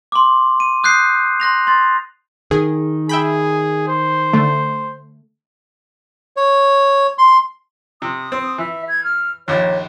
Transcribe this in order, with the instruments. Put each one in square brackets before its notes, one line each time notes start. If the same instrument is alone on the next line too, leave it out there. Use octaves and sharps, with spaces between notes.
[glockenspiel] C6 D6
D#7
D#6 F#6 G6 C7
C6 F#6 A#6 F7
C6 A6
[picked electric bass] D#3 [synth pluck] G#4
[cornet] G#4 [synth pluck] E5 G5 B5
[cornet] C5
[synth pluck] D3 A3
[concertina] C#5
C6
[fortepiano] C3 [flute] D#6
[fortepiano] C4
[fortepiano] E3 [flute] E5
[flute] G#6
F6
[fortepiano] A#1 D#2 [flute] C#5